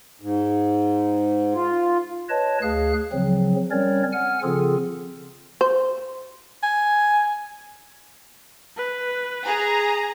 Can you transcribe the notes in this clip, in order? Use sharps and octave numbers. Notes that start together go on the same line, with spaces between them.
G#2
F4
B4 C#5 D#5 A5
D2 G#4 F5 F#6
C#3 F3 F#3 C4
G3 C4 C#4 A#4 C#5 D5
F#5 G#5 F6
C#3 F3 C4 F4 G#4 A4
C5
G#5
B4
G#4 A#5